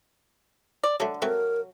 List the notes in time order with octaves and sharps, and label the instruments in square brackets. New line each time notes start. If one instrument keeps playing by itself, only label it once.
[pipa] D5
[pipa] D3 [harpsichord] F#3 A3
[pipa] F#3 [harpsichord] A3 C4 [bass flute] A#4